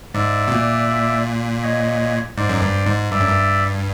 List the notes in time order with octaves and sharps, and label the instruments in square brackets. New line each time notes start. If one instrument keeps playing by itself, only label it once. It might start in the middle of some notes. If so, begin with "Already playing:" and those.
[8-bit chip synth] G#2 [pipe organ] D5 E5
[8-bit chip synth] B2
A#2
[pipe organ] C#5 D#5
[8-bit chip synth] G#2 [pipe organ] C5 D5
[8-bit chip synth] F#2
G2
G#2
[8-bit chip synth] G2 [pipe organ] D5 E5
[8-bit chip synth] F#2
G2